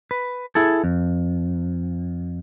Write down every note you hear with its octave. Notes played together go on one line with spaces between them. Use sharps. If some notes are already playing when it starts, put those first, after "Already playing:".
B4
E4 G#4 A4
F2